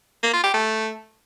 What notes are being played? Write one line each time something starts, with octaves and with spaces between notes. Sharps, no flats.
A#3
F4
G4
A3